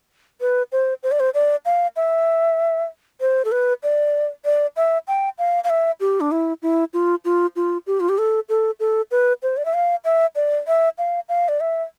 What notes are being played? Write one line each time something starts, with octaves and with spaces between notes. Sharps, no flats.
B4
C5
C5
D5
C5
D5
F5
E5
C5
A4
B4
D5
D5
E5
G5
F5
F5
E5
G4
D4
E4
E4
F4
F4
F4
G4
F4
G4
A4
A4
A4
B4
C5
D5
E5
F5
E5
D5
E5
F5
F5
D5
E5